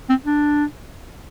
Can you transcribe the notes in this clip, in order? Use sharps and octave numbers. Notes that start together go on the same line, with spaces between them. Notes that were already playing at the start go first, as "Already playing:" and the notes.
C4
D4